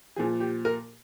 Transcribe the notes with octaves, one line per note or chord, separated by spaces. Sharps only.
A#2 F3 G#4
G4
A#4